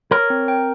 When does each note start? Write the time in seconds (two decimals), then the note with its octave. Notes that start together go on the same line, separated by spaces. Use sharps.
0.11 A#4 C#5
0.30 C4
0.48 G5